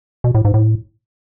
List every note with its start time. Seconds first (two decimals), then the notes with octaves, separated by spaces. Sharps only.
0.24 B2
0.35 A2
0.45 G#2
0.54 A2